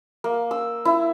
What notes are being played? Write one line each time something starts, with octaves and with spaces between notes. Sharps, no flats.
A#3
E6
E4